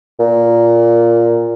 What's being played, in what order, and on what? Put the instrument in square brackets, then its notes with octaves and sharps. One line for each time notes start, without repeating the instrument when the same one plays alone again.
[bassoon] A#2